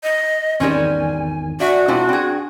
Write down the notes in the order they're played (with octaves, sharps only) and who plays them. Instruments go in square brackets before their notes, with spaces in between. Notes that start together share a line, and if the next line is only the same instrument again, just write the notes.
[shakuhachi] D#5
[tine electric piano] G#1 E2 D#3 [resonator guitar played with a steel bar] G3 C4 C#4 [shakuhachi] G#5
[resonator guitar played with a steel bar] D4 E5 G#5 [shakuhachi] F#4
[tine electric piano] B2 C4 F4 [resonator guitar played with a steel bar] G#3 D4 E4
[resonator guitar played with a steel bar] C4 G#4 [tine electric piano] D4 G5